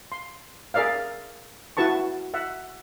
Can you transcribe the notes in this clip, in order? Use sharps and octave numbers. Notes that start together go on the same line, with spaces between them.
C6
G#4 A#4 D5 E5 F5
E4 F#4 B4 A5 C#6
E5 F#5